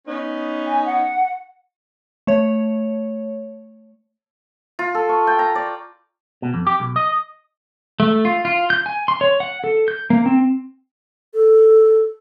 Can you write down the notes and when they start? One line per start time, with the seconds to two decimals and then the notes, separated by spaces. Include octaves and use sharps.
0.07 B3 C#4 D#4
0.67 G#5
0.85 F#5
2.27 A3 C#5
4.79 F4
4.95 A4
5.09 C#6
5.27 G5
5.39 A#5
5.55 D5
6.42 B2
6.54 F2
6.67 G4
6.80 B1
6.96 D#5
8.00 A3
8.25 F4
8.45 F4
8.70 G6
8.86 G#5
9.08 C6
9.21 C#5
9.40 F#5
9.64 A4
9.88 G6
10.10 A#3
10.26 C4
11.34 A4